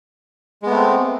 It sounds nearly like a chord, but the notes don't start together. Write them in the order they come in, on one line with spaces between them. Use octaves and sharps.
G#3 B3 A3 C4